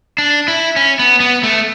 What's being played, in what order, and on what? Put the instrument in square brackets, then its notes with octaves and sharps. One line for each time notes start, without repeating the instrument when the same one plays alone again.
[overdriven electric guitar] D4
E4
C#4
B3
B3
A3